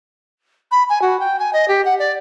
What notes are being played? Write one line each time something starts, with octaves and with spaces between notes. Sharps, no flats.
B5
G#5
F#4
G5
G#5
D#5
G4
F#5
D5